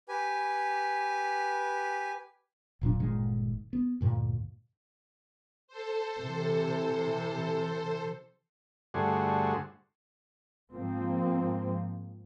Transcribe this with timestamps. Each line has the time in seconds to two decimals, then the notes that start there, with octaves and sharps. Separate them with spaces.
0.09 G4 B4 G#5
2.81 E1 A#2 F#3 D4
3.00 G1 A#2 D#3 G#3
3.73 B3
4.01 D2 G2 A#2
5.68 A4 C5
6.19 C3 E3
8.94 G2 D3 A3 F#4 G#4 C5
10.72 G#2 F3 A#3 C4